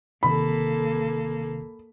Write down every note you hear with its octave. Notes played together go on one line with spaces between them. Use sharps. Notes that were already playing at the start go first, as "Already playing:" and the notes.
G#1 C3 D#3 A#3 A4 B5